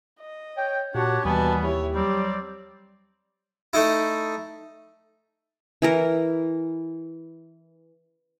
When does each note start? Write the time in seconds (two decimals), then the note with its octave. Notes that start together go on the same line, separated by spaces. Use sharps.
0.20 D#5
0.57 C#5 G5
0.95 A#2 D4 F#4 G4 C#5 F#5 A5
1.25 D#2 B2 E3 G3 B3 G#5 A5
1.64 E4 G4 C#5
1.95 F#3 G3 C4 D5
3.73 A3 D#4 E4
5.82 E3 E4 A#4